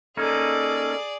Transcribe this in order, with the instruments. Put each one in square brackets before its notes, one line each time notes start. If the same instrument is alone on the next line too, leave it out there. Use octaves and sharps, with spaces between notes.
[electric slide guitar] A#3 C#4 D#4 [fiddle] G#4 D5 [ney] A4